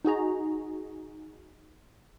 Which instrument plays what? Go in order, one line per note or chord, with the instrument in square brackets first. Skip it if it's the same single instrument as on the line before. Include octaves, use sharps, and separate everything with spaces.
[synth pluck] D#4 F#4 G#4 A#5